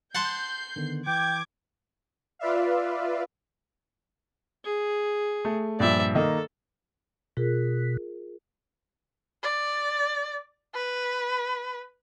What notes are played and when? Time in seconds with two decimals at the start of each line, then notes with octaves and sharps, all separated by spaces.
0.15 F#5 A5 C6 G6 C7
0.76 D3 D#3 B3
1.07 E3 G5 D6 G#6
2.39 F4 B4 D5 E5 F5
4.65 G#4
5.45 A3
5.80 G2 A#2 F3 D5 E5
6.15 D#3 A#3 A4 D#5
7.37 B2 F4 G#4 A#4
9.43 D5
10.74 B4